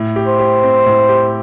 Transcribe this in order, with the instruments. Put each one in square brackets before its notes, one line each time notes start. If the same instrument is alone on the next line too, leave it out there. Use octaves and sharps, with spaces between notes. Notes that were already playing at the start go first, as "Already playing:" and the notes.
Already playing: [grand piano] A2
G4
[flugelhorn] C5
[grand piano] G4
C4
A2
G4